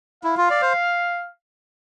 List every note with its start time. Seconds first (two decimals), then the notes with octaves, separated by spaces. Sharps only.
0.23 E4 F5
0.37 F4
0.50 D5
0.62 C5